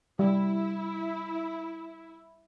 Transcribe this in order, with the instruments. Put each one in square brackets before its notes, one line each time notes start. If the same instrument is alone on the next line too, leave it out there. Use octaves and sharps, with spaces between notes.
[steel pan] G3 [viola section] E4